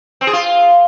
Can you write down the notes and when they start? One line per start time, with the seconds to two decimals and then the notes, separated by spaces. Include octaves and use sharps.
0.21 C4
0.27 G#4
0.33 F4